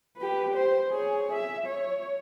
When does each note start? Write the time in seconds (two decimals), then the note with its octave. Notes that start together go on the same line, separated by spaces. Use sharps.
0.17 G4 B4
0.54 C5
0.91 G#4 C#5
1.33 E5
1.66 C#5